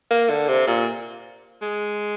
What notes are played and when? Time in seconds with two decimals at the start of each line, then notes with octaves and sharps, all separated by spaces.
0.11 A#3
0.30 D3
0.48 C3
0.67 A#2
1.62 G#3